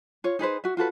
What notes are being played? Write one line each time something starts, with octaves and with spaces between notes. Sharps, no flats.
F4 C#5
D#4 G#4 B4 C5
F#4 E5
F4 F#4 A4 B4